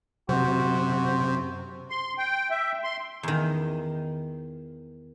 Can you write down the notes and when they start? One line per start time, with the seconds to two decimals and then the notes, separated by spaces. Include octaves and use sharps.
0.29 F#2 C3 F#3 F#4 C5
1.90 C6
2.18 G5
2.51 E5
2.84 C6
3.23 E2 D#3